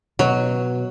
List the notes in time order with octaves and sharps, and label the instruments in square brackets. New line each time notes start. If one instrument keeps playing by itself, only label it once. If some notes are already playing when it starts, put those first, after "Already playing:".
[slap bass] B2 [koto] F#3